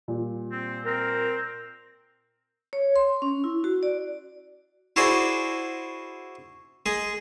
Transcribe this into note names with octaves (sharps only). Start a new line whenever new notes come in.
A#2 G3
C4
C4 A#4
C#5
C6
C#4
E4
F#4
D5
E4 F#4 G#4 C5 D5 B5
G#3 G#4